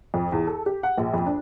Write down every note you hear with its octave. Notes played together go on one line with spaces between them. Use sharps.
F2
E2
A4
G4
F#5
A#1
F2
D4